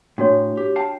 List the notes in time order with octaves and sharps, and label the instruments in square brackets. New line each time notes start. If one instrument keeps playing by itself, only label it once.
[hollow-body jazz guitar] A2 [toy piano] D4 F#4 C#5
[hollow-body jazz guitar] G4
F5 G5 A5